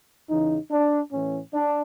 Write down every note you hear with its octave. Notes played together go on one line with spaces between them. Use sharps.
E2 C#3 E3 D#4
D4
A2 E3 C#4
D4